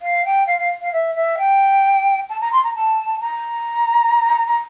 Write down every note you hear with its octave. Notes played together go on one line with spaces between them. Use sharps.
F5
G5
F5
F5
F5
E5
E5
G5
A5
A#5
C6
A#5
A5
A#5
A#5